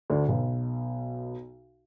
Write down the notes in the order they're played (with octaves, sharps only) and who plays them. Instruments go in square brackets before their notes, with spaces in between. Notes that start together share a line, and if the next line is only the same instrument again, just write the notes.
[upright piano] D2 D3
B1 B2